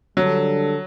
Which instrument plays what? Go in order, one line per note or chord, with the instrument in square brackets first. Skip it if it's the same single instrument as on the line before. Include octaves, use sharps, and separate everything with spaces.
[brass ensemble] D3 G3 D4 A4 [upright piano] F#3